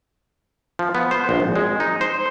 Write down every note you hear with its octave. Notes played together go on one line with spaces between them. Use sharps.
F3
B3
C5
A#1
G#1
G#3
D#4
C5